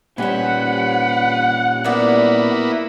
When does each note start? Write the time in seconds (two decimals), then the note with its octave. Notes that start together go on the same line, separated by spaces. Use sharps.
0.18 A#2 G3 C#4 B4 C5 F#5 G#5
1.84 B2 A#3 B3 E4 D5